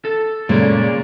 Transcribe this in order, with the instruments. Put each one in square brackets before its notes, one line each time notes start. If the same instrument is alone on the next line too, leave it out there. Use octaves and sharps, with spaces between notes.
[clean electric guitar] A4
[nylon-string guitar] A#2 C#3 G#3 [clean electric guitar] A#3 D5